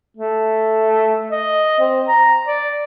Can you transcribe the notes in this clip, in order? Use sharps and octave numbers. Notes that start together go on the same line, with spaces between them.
A3
D#5
C4
A#5
D5